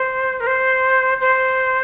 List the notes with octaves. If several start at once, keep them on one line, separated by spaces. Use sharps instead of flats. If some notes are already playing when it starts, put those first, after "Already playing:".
Already playing: C5
A#4
C5
C5